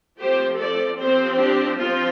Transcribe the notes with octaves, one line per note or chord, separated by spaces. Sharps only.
F3 A3 C4 G4 C5
A4 D5
F3 C4 G4 C5
D4 G4
F3 C4 F4